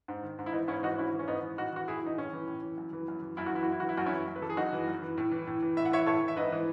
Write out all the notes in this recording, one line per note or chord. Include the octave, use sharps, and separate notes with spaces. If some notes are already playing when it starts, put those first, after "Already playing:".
G#2
D#3
G#2
E4
E3 B3 D#4
G#2 C#4 E4
E3 D#4 F#4
G#2 C#4 E4
E3
C#4
G#2 B3 D#4
E3
A2 D#4 F#4
E3 F#4
A2 E4 G#4
E3 D#4
A2 C#4
E3
A2
E3
F#2
E3
F#2
E3
F#2 E4
F#4
E3 E4
F#4
F#2 E4
E3 F#4
E4
F#2 F#4
C#4 E4
E3
F#2
B4
E3 A4
G#4
F#2 D#4 F#4
E3
F#2
E3
A2
E3
A2
E3
A2 E5
F#5
E3 C#5 E5
A2 A4 C#5
E3
E5
G#2 B4 D#5
E3